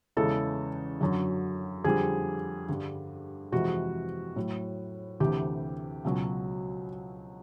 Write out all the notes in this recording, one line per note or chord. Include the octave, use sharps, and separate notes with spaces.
E2 C#3 E3 G#3 A4
F#2 D3 F#3
F2 D3 G3 G#4
G2 D3 G3
F2 C3 E3 G#3 F#4
A2 F#3
D2 C3 E3 G4
C#2 B2 F#3